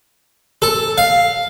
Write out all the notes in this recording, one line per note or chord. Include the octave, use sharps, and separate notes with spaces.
A4
F5